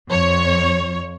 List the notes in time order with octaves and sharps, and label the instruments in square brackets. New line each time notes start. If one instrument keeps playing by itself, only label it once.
[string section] F2 C#5